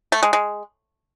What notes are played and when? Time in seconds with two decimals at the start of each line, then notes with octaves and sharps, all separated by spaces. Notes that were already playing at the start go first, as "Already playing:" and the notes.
0.12 A3
0.23 G#3
0.33 G#3